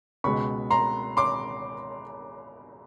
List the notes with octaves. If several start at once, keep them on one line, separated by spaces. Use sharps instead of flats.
C#2 B2 G#3 B5 C#6
A#5 C6
C6 D6